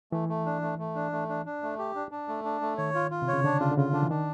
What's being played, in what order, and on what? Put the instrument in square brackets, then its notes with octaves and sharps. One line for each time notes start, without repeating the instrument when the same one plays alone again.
[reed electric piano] E3 [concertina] A3
[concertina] A3
D4
A3
A3
D4
A3
D4
D4
A3
G4
D4
D4
A3
D4
A3
[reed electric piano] D#3 [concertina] C#5
[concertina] F4
F4
[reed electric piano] C3
[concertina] C#5
[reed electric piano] C#3
[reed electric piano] D3 [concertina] D4
[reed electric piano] C#3 [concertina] F4
[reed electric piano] D3
[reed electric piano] C#3 [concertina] F4
[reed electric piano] D3 [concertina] D4
[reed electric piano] E3
[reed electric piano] D#3 [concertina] D4